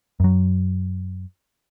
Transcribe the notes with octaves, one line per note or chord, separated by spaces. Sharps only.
F#2 F#3